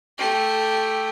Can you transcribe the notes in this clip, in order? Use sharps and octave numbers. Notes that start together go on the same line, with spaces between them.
A3 G4